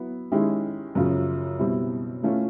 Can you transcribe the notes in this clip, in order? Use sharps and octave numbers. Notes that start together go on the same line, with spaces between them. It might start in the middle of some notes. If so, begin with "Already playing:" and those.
Already playing: F#3 B3 E4
D#3 G#3 C#4 E4 G4
F#2 C#3 F3
B2 G3 C4 E4
E3 A3 C#4 F4